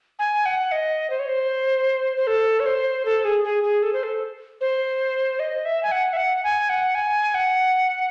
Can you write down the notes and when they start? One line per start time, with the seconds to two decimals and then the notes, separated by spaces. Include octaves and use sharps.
0.19 G#5
0.46 F#5
0.72 D#5
1.10 C5
1.19 C#5
1.28 C5
2.17 C5
2.27 A4
2.60 C#5
2.66 C5
3.05 A4
3.25 G#4
3.44 G#4
3.63 G#4
3.83 A4
3.93 C5
4.03 A4
4.61 C5
5.39 D#5
5.65 E5
5.83 G#5
5.92 F#5
6.13 E5
6.17 F#5
6.44 G#5
6.69 F#5
6.95 G#5
7.35 F#5